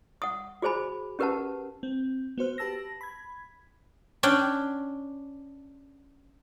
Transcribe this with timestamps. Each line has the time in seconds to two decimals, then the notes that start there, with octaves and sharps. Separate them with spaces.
0.22 F#5 D#6
0.62 F#4 G#4 C5 G#5 B5
1.19 C#4 G4 A#4 B4 F#5 A5
1.83 C4
2.38 B3 F#4 C5 F6
2.58 G4 B4 A5 E6 A#6
3.01 B5 G#6
4.23 C#4 D4 G5